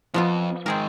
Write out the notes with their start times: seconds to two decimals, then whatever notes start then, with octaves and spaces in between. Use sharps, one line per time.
0.14 F2 F3 B3 F4
0.66 G#2 D#3 C4 G#4 A#4